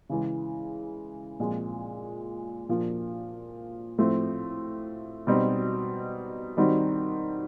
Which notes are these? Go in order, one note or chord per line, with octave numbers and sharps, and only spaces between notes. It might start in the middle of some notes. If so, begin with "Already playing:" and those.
C#3 E3 G#3
A#2 F3 G#3 C4
A#2 F3 A#3 D4
A2 F3 A3 C4
B2 G3 C4 D#4
D#3 G3 C4 D#4 F#4